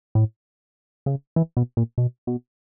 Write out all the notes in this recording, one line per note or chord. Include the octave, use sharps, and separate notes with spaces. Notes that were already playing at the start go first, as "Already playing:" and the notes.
A2
C#3
E3
B2
A#2
B2
B2